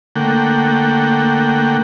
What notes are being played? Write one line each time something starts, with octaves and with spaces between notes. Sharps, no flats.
D3 A3 A#3 F#5 G5